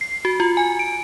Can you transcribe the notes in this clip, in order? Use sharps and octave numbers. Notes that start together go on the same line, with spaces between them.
C7
F#4
F4
G#5
D7